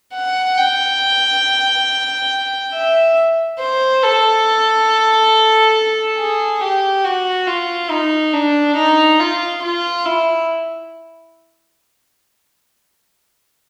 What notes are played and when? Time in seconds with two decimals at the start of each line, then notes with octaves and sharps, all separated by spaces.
0.14 F#5
0.57 G5
2.73 E5
3.59 C5
4.03 A4
6.18 G#4
6.61 G4
7.04 F#4
7.47 F4
7.91 D#4
8.33 D4
8.77 D#4
9.20 F4
9.63 F4
10.06 E4